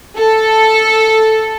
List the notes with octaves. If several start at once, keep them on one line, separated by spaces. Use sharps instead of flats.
A4